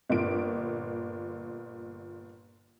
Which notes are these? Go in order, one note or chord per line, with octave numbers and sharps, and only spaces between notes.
G1 A#2 D7